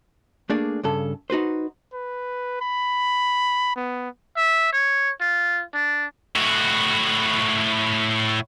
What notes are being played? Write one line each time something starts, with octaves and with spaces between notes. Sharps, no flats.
A3 A#3 D4 G#4 D5
G2 C#3 A4
D#4 F#4 B4 C5
B4
B5
B3
E5
C#5
F4
D4
A2 F#4